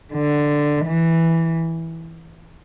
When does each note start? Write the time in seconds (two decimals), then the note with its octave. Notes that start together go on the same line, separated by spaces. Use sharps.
0.14 D3
0.85 E3